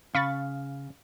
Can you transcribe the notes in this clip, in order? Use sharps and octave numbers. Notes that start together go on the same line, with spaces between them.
C#3 F5 B5 C#6 A6